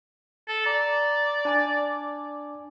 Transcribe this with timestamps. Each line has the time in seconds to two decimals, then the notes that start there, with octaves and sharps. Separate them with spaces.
0.48 A4
0.66 D5 A#5
1.45 D4 G#5 D6